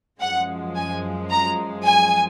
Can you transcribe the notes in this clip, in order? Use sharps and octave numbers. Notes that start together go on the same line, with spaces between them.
F#2 F3 G#3 F#5
G#5
A#5
G#5